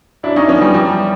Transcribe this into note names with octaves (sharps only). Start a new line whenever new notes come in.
F#2 D4 E4
C#4 D#4
F3 B3 C#4
G3
E3 G3